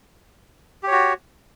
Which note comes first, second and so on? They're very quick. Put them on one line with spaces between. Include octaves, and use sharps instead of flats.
G4 C#5 F#4